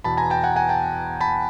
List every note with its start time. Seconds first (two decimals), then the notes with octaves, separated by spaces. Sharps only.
0.04 E2 B2 A5 B5
0.17 G#5 A#5
0.30 G5 A5
0.44 F#5 G#5
0.56 F#5 G#5
0.69 G5 A5
1.21 A5 B5